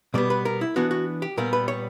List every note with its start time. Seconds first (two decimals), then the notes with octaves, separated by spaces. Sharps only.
0.14 B2 G3 B3 D5
0.30 B4
0.45 A#4
0.61 E4
0.76 E3 B3 D4 F#4
0.91 F#4
1.22 G4
1.37 A#2 G3 B3 A#4
1.53 B4
1.68 C#5